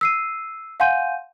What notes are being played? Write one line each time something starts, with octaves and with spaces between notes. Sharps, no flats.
E6 C7 D#7
F5 F#5 G#5 C6 G6 D#7